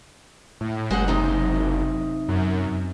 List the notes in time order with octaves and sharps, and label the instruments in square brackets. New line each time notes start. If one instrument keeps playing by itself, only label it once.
[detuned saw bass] A2
[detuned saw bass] F#1 [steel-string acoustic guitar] G#3 C5 F#5
[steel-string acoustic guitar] C3 D#4
[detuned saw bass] F#2